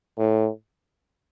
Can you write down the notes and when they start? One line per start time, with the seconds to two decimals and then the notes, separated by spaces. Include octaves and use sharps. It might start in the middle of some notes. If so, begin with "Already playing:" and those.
0.18 A2